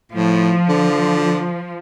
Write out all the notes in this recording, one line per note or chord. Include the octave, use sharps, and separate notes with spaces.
A2 F3
D3